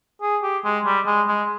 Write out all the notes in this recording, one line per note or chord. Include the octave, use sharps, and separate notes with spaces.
G#4
G4
G#3
G3
G#3
G#3